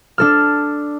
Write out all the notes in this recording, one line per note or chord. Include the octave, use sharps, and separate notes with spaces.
D4 A4 F6